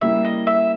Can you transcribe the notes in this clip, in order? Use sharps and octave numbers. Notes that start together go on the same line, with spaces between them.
C#3 G3 A#3 E4 E5
D#5
E5